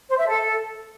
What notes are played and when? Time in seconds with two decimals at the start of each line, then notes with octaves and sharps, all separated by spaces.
0.09 C5
0.18 E5
0.27 A4